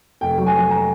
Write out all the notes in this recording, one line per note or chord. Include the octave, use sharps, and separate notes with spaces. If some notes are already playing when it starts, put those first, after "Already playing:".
F1 G5
F#3
G#5
F#3
A#5